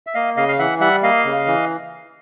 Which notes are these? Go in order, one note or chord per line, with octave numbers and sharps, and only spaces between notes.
E5
A#3 D#5 F5
C#3 D#5 F5
F5
E3 E5 F#5
G3 E5 F#5
A#3 D#5 F5
C#3
E3